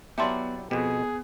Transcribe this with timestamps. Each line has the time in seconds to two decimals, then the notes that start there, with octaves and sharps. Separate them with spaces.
0.18 F#3 B3 E4 G4 D5 E5 A5 C6
0.71 F2 B2 B3 G#4